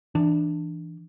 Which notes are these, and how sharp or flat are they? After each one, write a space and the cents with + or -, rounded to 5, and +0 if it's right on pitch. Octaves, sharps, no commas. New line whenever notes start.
E3 +0 D4 +15